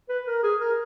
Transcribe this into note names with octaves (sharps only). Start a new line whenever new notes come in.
B4
A#4
G#4
A#4